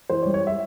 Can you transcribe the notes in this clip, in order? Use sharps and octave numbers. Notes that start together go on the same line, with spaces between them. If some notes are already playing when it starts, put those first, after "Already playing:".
E3 C5
C#5
G3
C#5
E5